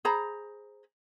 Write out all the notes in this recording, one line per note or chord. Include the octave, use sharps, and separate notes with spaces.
G#4 C5 A#5 B5